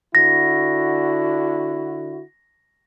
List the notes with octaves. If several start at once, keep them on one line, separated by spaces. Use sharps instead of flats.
D3 E4 F#4 A#6